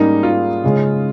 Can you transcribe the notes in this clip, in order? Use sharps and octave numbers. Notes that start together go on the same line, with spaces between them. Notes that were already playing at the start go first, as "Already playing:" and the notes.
Already playing: G#2 G3 A#3 C#4 D#4
F4
C#3 G#3 C#4